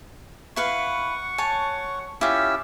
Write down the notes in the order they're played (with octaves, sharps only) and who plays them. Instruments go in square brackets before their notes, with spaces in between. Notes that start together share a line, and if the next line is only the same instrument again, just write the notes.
[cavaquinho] E4 B4 F5 [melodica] F#5 C#6
[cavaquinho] C#5 G#5 A5
[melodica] C#4 G4 E6 [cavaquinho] E4 F4